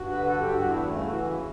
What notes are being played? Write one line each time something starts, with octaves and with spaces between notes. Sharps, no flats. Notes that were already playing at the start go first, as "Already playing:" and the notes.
Already playing: G2 F#4
D3 B4
G2 A4
G4
G2
F#4
E2 E4
C#3 A3
E4
E3 F#4
C#3 E4